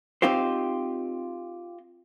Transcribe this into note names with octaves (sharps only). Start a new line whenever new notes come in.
C4 D#4 F4 G4 C5